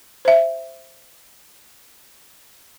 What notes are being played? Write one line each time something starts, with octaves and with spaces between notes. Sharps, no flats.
C5 E5